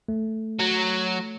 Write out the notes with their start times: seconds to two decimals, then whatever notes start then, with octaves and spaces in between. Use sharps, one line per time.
0.08 A3
0.60 F#3